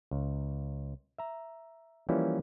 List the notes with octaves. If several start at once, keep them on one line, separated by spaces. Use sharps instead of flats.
C#2
E5 A#5
E3 F3 G3 A#3 C#4 E4